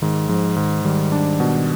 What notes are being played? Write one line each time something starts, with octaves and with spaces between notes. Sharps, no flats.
G#2 D#3
G#2 F3
G#2 D#3
D#3 G3
D4
B2